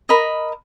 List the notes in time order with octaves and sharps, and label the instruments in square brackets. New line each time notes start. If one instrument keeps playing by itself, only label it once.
[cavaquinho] A#4 D#5 B5